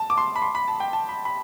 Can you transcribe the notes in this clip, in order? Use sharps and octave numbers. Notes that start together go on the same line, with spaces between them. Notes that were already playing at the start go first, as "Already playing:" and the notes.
Already playing: A5
D6
C6
B5
C6
B5
A5
G5
A5
B5
B5